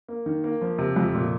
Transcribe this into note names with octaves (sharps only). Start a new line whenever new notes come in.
A#3
D#3
A#3
F3
C3
F2
A#2